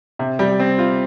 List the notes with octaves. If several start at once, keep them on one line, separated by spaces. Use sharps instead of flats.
C3
G3
C4
F4